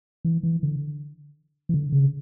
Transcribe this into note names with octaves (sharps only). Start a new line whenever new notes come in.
E3
E3
D3
E3
D3
C#3